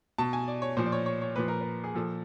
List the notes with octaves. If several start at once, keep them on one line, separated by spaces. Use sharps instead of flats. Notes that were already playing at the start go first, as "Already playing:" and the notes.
B2 A5
G#5
D5
C#5
A#2 F3 C5
D5
C#5
C#5
C#5
A#2 F3 B4
A#4
B4
G#4
A#2 F3 A4